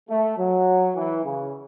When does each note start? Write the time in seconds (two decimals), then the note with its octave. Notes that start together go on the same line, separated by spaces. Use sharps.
0.09 A3
0.38 F#3
0.95 E3
1.24 C#3